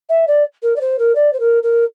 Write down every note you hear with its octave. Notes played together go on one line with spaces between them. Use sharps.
E5
D5
A#4
D5
C5
A#4
D5
C5
A#4
A#4